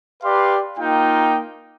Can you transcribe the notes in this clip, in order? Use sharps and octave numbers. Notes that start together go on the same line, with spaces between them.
G4 B4 D5 F5 C6
A#3 D#4 F4 G5